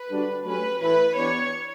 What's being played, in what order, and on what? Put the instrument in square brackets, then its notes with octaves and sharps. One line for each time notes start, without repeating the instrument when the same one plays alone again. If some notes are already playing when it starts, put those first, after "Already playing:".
Already playing: [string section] B4
[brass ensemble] D3 G3 D4 F#4
[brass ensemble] F#3 A3 C#4 G4 [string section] B4
[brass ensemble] A2 E3 A3 E4 [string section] B4
[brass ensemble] E3 B3 D4 G4 [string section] C#5